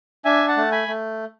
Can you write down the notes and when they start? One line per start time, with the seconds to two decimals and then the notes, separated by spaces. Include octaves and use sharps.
0.25 D4 E5 G#5
0.48 F#5 A5
0.57 A3
0.72 G#5 B5
0.88 A3